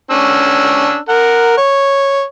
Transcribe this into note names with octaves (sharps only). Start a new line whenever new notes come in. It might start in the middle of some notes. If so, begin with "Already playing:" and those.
C#4 D4 E6
A#4 F#5
C#5